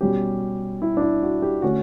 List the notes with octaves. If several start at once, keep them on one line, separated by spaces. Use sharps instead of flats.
B2 G3 C#4 G4
E4
D4
E4
F#4
G4
D3 A3 C#4 F#4